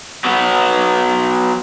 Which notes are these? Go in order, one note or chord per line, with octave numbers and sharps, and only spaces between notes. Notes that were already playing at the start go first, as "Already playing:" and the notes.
F#3 B3